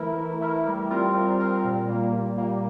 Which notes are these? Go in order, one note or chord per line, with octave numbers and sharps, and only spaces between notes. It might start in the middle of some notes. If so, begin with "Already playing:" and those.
Already playing: E3 A3 E4 A#4
E3
A3 E4 A#4
G3
C4 F4 A#4
G3
C4 F4 A#4
A#2
G3 A#3
A#2
G3 A#3